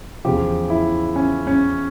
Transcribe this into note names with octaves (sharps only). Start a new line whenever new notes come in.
E2 C#3 F3 G4
E4
C#4
C#4